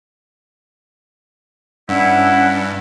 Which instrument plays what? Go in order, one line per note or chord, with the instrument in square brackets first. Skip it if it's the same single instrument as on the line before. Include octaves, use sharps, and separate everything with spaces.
[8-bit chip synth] G2 [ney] C#4 [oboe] E4 [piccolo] F#5